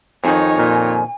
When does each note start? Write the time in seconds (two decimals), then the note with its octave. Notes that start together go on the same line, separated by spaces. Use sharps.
0.24 F2 D#3 D#4 C#5 G#5
0.58 A#2